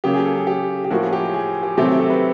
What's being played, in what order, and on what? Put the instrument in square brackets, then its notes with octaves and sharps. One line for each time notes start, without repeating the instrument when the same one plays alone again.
[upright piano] C#3 F#3 A#3 G4
G#4
A4
G#4
G4
G4
A2 F3 A#3 F#4
G#4
G4
G#4
G4
C3 D#3 F#3 A3 C4 G4
G4
A4
B4